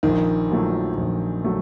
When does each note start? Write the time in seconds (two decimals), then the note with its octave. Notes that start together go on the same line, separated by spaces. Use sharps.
0.03 A#1 D#3
0.50 A#2 F#3 A3
0.97 A#1
1.44 F#3 A3